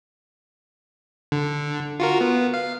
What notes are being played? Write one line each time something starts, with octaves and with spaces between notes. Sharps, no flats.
D3
F4 F#4 A#4
B3
F5